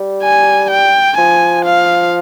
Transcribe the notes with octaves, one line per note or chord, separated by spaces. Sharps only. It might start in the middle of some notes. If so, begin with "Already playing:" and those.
Already playing: G3
G#5
G5
F3 G#5
F5